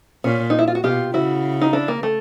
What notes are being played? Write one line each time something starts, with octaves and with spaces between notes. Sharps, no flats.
A#2 C#4
D#4
E4
F4
F#4
B2 F4 G4
C#3 E4 F#4
D#4
D4 E4
A#3
A3